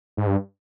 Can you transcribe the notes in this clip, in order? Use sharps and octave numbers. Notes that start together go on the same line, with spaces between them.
G#2
G2